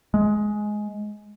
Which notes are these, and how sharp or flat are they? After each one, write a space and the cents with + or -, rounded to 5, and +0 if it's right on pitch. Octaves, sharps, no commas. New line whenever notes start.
G#3 +15